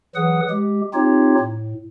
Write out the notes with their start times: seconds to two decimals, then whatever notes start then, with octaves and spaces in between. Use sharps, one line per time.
0.15 E3 F#3 G#4 B4 F#5 D#6
0.50 G#3 G4
0.94 C4 D#4 F4 G4 C#5
1.40 A2